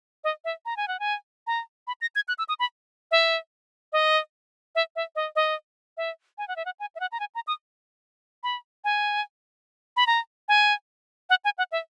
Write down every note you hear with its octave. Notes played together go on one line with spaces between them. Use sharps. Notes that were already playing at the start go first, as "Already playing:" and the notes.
D#5
E5
A#5
G#5
F#5
G#5
A#5
B5
A#6
G#6
F#6
E6
D#6
B5
E5
D#5
E5
E5
D#5
D#5
E5
G#5
F#5
E5
F#5
G#5
E5
F#5
A#5
G#5
A#5
D#6
B5
G#5
B5
A#5
G#5
F#5
G#5
F#5
E5